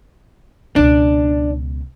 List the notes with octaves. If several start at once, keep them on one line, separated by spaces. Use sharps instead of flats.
C#2 B2 D4